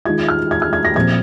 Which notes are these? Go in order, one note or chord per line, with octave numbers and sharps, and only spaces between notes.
D#3 G#3 F4 G#6
F6
G#6
F6
G#6
A#6
A#2 F3 C4 G#6